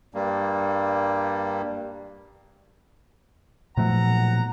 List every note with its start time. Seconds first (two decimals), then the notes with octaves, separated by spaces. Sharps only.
0.14 G2 G3 A#3
3.77 B1 A#2 F3 A3 F#5 A#5